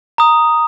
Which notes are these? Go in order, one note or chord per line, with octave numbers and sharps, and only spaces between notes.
A#5 D#6